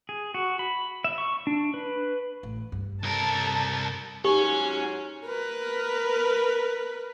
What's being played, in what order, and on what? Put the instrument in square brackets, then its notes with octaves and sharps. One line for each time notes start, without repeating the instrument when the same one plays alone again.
[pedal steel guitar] G#4
F#4
B5
E5
C#6
D4
B4
[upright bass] A1
G2
[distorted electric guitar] C2 A#4 [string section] A4 A5
[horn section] G#2 F#3 G#5 [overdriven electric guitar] C#4 [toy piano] G4
[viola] A#4 B4